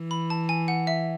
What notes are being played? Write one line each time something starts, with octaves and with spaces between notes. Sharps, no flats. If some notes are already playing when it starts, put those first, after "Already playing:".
Already playing: E3
B5
A5
G#5
F#5
E5